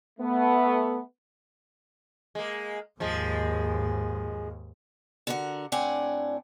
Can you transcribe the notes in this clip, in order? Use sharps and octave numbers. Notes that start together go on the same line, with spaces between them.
A3 B3
G#3 A#3
D#2 G#2 F3 G#3
D3 F#4 A#4 C#5 F#5
A2 C4 D4 D5 F#5 G#5